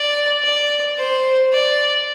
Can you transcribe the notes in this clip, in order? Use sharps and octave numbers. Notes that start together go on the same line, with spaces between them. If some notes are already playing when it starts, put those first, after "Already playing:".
Already playing: D5
D5
C5
D5